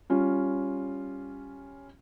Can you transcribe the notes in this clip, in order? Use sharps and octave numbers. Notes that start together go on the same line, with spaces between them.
G3 C#4 F4